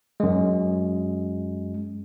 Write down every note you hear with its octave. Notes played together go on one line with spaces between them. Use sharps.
F#2 G#3